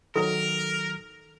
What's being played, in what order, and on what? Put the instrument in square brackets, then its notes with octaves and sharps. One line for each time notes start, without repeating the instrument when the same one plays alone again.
[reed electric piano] D#3 F#3 [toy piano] A4 [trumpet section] A#4